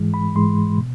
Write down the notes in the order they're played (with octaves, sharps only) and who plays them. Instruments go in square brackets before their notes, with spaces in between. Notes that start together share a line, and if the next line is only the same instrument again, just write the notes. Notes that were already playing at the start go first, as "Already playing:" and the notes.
Already playing: [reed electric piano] G#2 E3 G#3
B5
G#2 E3 G#3 C6
B2